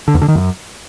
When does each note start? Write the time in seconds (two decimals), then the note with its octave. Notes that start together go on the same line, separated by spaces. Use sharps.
0.08 D3
0.15 E2
0.21 D3
0.28 D#3
0.35 F#2